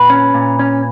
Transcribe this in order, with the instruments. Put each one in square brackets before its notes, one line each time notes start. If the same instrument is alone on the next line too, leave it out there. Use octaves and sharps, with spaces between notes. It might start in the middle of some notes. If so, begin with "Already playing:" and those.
Already playing: [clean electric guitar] A#2 B4
C#4
A#2
C#4